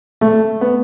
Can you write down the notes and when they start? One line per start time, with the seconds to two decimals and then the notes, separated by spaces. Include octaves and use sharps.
0.21 A3
0.61 B3